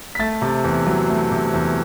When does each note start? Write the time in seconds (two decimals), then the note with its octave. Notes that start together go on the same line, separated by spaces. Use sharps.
0.15 B6
0.19 A3 A6
0.42 C3
0.64 E2
0.87 F#3
1.09 A3
1.32 C3
1.54 E2